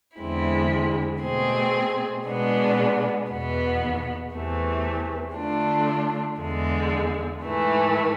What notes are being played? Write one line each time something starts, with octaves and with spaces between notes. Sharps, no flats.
E2 D3 G#3 C4 E4
B2 A3 C4 G#4
B2 G#3 B3 D4
E2 B2 B3
E2 C3 E3 A3
D3 A3 D4 F4
E2 D3 G#3
G#2 E3 A3